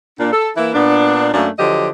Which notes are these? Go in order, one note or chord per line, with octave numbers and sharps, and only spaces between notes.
A#2 D4
A4
E3 A#3 E4
A#2 B3 D4
F#2 A3 A#3 C#4 D4
D3 F3 F#3 G4 D#5